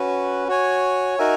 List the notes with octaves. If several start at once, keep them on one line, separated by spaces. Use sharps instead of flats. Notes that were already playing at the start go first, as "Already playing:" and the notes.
Already playing: C#4 F#4 B4
F#4 C#5 G#5
D#4 F#4 A#4 E5 G#5